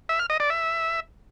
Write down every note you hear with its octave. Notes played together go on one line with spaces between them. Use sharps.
E5
F6
D#5
D5
E5